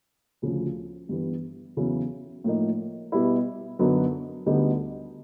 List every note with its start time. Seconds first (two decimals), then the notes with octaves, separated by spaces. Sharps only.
0.42 D2 C#3 F3
1.09 G2 E3 G3 B3
1.77 E2 C#3 F#3 B3 E4
2.44 A2 F3 A#3 D#4
3.12 B2 G3 B3 E4
3.79 F#2 D3 F#3 B3 D#4
4.46 D2 D3 G3 B3 D#4